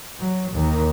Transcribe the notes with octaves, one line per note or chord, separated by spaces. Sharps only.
F#3
D#2 D#3